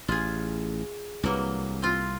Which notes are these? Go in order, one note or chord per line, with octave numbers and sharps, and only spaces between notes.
A1 F4 G#4
C2 E3 F#3 A#3
C4 F4